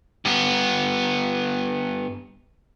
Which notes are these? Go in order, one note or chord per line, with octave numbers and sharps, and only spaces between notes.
G2 B3